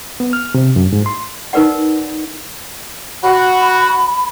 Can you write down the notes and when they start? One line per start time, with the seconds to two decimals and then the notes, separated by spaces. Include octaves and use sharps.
0.20 B3
0.33 F6
0.54 C3
0.76 F#2
0.93 G#2
1.06 C6
1.53 D#4 A#4 B4 D5 F#5
3.24 F#4 B5